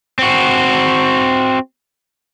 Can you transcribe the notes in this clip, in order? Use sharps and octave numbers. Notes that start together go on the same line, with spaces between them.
C4 F#4